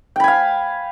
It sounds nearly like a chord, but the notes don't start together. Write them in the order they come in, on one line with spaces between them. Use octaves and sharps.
G5 B5 G#5 F5